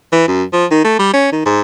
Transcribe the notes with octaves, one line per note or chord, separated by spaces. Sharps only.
E3
F#2
F3
D#3
A3
G3
C#4
D#3
G#2